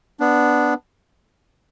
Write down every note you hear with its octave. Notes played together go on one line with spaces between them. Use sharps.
B3 D4